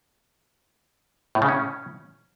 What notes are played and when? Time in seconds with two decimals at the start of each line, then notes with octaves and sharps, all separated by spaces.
1.35 A2
1.42 C#3
1.48 C#4